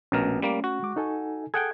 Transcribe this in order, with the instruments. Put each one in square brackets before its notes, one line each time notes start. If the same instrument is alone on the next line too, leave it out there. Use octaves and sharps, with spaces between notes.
[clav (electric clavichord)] A#1 B2 A#4 [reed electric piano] A3 C#4
[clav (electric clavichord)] G3 A#3
F#4
[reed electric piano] G#3 D6
D#4 A4 G#5
[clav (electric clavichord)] G#4 F#5 G5 [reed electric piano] A4 G#6